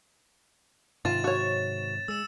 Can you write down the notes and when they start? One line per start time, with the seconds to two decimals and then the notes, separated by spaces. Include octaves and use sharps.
1.05 G#2 C3 D#3 F4 A6 E7
1.24 F#4 C#5
2.08 G#3 E6 E7